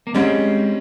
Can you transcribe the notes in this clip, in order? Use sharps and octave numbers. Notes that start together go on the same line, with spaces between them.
A#3
G#2 G3 G#3 C4 C#4